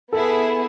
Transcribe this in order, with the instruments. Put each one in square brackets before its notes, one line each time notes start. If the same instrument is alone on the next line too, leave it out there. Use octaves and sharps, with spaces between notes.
[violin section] B3 E4 G#4 [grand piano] A4